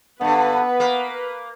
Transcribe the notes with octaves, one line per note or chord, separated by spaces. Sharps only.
G2 D3 B3 B4
A#3